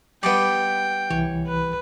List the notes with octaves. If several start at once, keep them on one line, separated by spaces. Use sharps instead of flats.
G3 B3 D#5 G5 B5 D6
C2 E3 C#5
B4